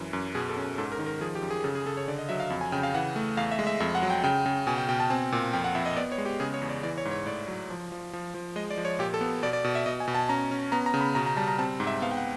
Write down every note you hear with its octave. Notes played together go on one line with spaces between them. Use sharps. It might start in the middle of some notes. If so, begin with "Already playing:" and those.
Already playing: F#2 E3
F#2
B2 G#4
A4
C#4
G#2 A4
A#4
D#3
A#4
F3 G#4
G4
F#2
G#4
C#3 A4
G#4
C#3 A4
C#5
D3 D5
D#5
F#3 E5
F5
F2
G#5
C#3 G5
F5
E3 F#5
A3
E2 F5
E5
G#3
E5
F2 E5
F#5
F#3
G5
C#3 G5
C#3
B2 G#5
G5
B2 G5
A5
C4 G#5
A#2
F2 G5
F#5
F2 E5
D#5
B3 D5
C#5
G#3
G4
C#3 G#4
C#5
E2
D5
E3 D5
C#5
G#2
C#5
A2 D5
F#3
F3
F3
F3
F3
G#3 D#5
D5
F3
C#5
A#2 G4
A4
B3
B2 D5
D5
B2
E5
B2 D#5
G#5
B2
A5
C#4 A#5
C#4
B3 A#5
A#5
C#3
B5
B2 A#5
A#5
G3 A5
A#5
C4 A5
G#2
E5
B3 F5
G5
F#5